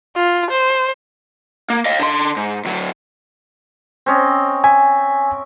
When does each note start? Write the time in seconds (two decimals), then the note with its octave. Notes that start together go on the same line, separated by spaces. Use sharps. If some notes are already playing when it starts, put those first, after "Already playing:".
0.16 F4
0.50 C5
1.70 A#3
1.86 D#5 F5
1.99 D3 C6
2.37 G#2
2.65 D2 F#3
4.06 C4 C#4 D#5
4.64 E5 G#5